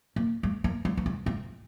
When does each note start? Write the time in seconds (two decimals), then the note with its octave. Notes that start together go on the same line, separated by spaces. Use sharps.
0.16 A#3
0.43 G#3
0.64 A#3
0.85 G#3
0.97 A#3
1.06 G#3
1.26 G#3